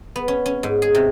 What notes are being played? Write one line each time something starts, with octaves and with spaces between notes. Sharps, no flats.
B3
C#4
C#4
G#2
G#4
C3